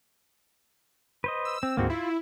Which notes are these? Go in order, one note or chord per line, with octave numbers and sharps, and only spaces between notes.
B4 C5 D#5
E6
C4
D2 G#2 A#3 C4 F#4
E4 F4